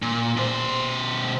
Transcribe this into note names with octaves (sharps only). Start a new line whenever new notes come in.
A#2
B2 C5